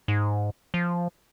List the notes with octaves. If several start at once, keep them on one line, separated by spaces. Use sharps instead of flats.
G#2
F3